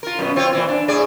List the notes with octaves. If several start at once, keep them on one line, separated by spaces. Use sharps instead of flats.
F4 A#4
F#2 B2 B3
C4 F4 C#5
A#2 E3 C4
D4
A2 G#4 D5